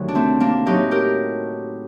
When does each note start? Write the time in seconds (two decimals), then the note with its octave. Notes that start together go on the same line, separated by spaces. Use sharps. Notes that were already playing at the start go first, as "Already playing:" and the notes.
Already playing: D2 C3 D#3 F#3
0.08 D4
0.15 A3 C4
0.40 A#3 D4
0.66 A2 F#3 D#4 G4
0.91 G4 A#4